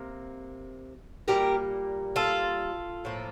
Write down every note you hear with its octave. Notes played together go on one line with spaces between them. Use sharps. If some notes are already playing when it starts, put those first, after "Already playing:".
Already playing: C3 A#3
A#2 G3 A#3 G4 A#4
F4 A4
A2 F3 A#3